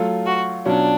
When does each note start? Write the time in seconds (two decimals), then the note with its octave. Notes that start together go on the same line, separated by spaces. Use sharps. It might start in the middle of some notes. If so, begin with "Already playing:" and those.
Already playing: F#3 A3 F4 A4
0.26 F#4
0.66 B2 F#3 C#4 D4 F4